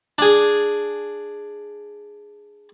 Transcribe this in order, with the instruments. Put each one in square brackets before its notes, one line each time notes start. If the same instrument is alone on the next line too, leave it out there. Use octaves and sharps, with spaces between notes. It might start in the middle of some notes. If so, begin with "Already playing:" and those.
[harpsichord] D4 G#4